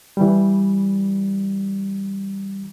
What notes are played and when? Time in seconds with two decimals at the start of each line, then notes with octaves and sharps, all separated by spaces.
0.17 E3 G3